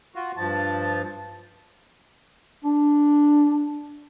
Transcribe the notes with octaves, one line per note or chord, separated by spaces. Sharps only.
F4 F#4
G2 F3 A5
D4